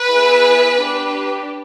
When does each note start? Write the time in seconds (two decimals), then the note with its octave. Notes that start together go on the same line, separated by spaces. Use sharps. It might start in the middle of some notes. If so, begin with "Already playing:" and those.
Already playing: B4
0.09 B3 E4 G#4
0.79 D4 G4